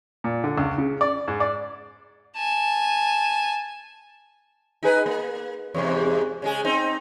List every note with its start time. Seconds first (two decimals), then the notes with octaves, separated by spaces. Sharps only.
0.24 A#2
0.44 D3
0.58 C#2
0.78 C#3
1.01 D5
1.28 G#2
1.40 D5
2.37 G#5 A5
4.83 D#4 G#4 B4
5.06 A#3
5.74 E2 G#2 C3
6.42 C#3 G#3 G#4
6.64 C4 D#4